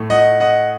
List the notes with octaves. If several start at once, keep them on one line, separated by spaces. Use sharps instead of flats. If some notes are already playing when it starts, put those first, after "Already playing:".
Already playing: A2 A3
D#5 F#5
D#5 F#5